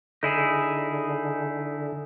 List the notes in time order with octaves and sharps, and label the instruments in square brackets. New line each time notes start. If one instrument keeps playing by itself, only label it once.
[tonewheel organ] D3 [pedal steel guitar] D#4 E4 G#4